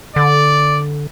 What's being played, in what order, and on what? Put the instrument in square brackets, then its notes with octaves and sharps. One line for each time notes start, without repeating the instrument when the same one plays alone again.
[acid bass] D3 [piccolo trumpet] D5